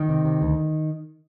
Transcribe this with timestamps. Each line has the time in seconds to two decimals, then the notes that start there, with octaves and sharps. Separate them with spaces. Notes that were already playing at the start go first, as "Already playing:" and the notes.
Already playing: D#3
0.09 C3
0.25 C3
0.42 D2